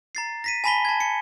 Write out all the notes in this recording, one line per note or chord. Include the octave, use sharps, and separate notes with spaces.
A#5 A6 C7
A#6 B6 D#7
G#5 A5 B5 A#6 B6 G7
A5 G#6
C#7